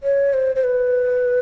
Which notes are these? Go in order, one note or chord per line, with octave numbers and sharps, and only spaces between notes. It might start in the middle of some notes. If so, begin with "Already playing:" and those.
C#5
C5
C5
B4